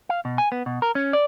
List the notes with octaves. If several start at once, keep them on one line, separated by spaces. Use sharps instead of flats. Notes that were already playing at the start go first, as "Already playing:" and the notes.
F5
B2
G#5
B3
B2
A#4
C#4
D5